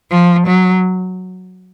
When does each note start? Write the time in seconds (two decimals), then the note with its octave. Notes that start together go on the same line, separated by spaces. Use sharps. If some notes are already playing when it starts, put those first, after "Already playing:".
0.11 F3
0.47 F#3